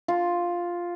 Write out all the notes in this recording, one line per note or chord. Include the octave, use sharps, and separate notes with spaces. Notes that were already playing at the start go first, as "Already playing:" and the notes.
F4